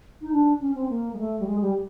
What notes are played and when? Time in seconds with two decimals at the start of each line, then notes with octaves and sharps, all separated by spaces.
0.22 D#4
0.32 D4
0.61 C#4
0.75 C4
0.90 A#3
1.13 G#3
1.19 A3
1.40 G3
1.47 G#3
1.61 G3